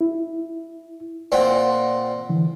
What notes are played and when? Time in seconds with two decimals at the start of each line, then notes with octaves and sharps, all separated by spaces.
0.01 E4
1.32 A#2 C4 D5 F#5
2.29 D3 E3